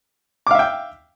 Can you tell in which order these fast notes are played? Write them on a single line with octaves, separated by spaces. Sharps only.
D6 F5 E5 G5